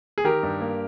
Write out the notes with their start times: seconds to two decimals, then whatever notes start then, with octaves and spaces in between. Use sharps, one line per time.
0.18 G#4
0.24 D#3 G4 A#4
0.43 G2
0.60 A#3